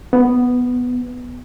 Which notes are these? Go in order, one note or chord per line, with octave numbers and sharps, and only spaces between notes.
B3